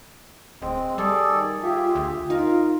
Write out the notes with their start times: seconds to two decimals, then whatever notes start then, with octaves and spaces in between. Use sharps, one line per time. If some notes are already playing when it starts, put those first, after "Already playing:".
0.62 D1 G#3 C4
0.98 G3 G#4 A4 D5
1.28 D#3
1.63 F4 G4 G#4 E5
1.95 D2
2.30 D#4 F4 A#4